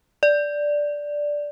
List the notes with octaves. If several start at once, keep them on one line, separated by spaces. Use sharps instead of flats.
D5